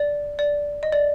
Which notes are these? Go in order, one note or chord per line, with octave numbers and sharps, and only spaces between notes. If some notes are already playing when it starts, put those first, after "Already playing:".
Already playing: D5
D5
D#5
D5